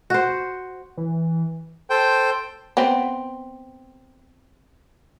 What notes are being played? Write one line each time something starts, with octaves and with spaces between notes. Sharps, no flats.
F#4 C5
E3
A4 C5 G5
B3 C4